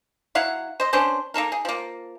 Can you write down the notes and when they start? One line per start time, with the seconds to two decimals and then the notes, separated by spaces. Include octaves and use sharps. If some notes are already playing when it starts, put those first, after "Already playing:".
0.35 F#3 E4 F5 F#5
0.80 C5 D#5
0.93 C#4 D4 B4 C5
1.34 A#3 D#4 A4 A#4
1.52 G#4
1.65 F3 A#3